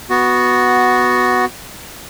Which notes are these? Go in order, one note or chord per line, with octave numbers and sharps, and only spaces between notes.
B3 F#4